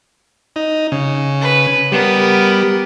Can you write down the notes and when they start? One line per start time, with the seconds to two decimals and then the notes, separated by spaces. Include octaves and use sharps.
0.56 D#4
0.92 C#3
1.41 B4
1.92 G3 B3 A#4